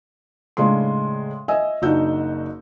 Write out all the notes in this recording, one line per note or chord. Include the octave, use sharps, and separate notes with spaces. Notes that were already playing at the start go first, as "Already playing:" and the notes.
A2 C#3 G#3 D4 C6
D#5 E5 G#5 E6
F#1 D4 D#4 F#4 E6 G6